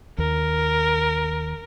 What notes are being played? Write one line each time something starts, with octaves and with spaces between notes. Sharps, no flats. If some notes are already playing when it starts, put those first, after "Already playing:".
D#2 A#4